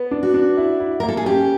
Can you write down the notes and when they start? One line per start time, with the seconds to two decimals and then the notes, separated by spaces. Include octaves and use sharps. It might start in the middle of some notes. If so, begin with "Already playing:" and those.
Already playing: B3
0.11 D4
0.23 F#4
0.34 D4
0.57 E4
0.80 E4
1.00 A#4
1.03 A#3
1.08 A4
1.17 G#4
1.26 C#4 G4